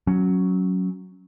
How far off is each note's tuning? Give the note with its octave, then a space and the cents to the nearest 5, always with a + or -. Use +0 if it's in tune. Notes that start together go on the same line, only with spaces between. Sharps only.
F#3 +0 C#4 +0